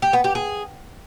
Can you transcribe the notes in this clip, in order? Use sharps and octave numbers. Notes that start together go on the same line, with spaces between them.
G4
B3
G4
G#4